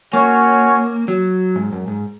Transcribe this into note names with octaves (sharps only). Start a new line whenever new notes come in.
A#3 C#4 F#4 C#5
F#3
G#2
F#2
G#2